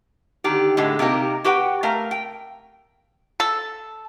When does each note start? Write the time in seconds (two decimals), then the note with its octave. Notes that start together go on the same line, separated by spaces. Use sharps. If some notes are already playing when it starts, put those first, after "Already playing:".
0.44 D3 D#3 G4
0.77 A2 D3 G#3
0.99 C3 A#3 D#4 G4 A#4
1.44 F#4 G4 B4 F#5 G5
1.83 A3 A#4 F5
2.11 G5
3.40 A4